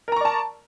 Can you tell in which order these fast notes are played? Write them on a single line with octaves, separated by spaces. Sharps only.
A#4 A#5 C#6 D5 A5